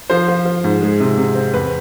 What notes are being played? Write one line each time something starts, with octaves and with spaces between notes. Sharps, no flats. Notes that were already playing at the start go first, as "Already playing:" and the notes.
F3 C5
F3
F3
G#2
G#3
C3
C3
C4
E2 B4